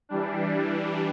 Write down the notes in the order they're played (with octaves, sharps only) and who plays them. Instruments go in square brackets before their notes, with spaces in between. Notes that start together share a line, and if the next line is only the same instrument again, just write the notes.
[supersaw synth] E3 G3 D4